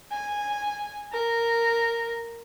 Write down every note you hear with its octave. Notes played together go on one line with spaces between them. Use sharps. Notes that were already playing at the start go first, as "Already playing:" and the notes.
G#5
A#4